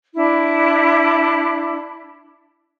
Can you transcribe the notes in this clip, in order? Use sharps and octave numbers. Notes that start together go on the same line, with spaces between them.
D4 E4